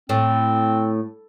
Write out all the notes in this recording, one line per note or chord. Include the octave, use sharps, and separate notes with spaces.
A2 C4